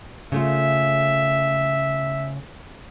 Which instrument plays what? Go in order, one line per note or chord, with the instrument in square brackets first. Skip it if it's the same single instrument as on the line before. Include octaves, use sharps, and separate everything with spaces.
[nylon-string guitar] C#3 A3 F4 [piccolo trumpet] E5